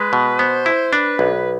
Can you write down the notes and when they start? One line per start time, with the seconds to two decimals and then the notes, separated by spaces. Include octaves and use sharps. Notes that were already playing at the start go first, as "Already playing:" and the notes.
Already playing: G#3 B4
0.13 B2
0.39 B3 C5
0.66 E4
0.93 D4 B4
1.19 B1